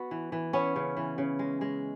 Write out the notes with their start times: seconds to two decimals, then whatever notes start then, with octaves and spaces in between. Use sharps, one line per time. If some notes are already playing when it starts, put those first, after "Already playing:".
Already playing: B3 F#4
0.11 E3
0.32 E3
0.53 B3 C#4
0.76 C#3
0.97 E3
1.18 C#3
1.39 G#3
1.61 G#3